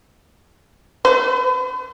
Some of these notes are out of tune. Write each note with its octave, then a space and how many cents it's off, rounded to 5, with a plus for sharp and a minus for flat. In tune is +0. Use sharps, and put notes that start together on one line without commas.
B4 +40